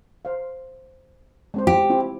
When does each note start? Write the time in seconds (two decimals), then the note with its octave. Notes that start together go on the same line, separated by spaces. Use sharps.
0.25 C5 F5
1.54 G#3 C4 C5
1.67 G4
1.90 C4 E4 F4